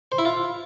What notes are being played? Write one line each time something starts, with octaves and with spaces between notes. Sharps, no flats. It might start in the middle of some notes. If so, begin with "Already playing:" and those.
C5
E4
F4